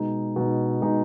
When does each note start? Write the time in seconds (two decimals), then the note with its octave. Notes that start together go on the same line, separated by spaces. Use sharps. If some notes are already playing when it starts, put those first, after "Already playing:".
Already playing: B2 G#3 D#4
0.36 B2 G#3 D#4
0.82 B2 G#3 D#4